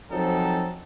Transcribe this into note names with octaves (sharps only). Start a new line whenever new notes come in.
F3 F#3 C4 D#4 G#4 A4